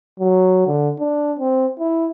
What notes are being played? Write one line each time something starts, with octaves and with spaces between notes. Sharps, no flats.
F#3
D3
D4
C4
E4